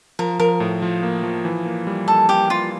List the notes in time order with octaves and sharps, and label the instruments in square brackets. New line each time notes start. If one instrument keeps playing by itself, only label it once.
[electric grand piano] F3 [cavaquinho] A#4
[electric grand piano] F3 [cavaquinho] A#4
[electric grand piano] A2
F3
A#3
F3
E3
A#3
G3
[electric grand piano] G3 [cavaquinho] A4
[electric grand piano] A#3 [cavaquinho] G4
[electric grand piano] G3 [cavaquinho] F4